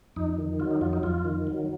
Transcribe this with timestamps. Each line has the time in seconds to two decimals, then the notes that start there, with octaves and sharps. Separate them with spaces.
0.16 F2 D#4
0.38 D#3
0.59 F#3 F4
0.71 D#4
0.81 F2 F4
0.93 D#4
1.03 F2 F4
1.24 D#3
1.47 F#3